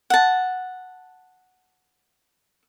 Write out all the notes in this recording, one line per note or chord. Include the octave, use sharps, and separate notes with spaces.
F#5 A5